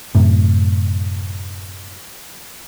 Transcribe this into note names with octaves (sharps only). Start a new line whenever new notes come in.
F#2 A2 C3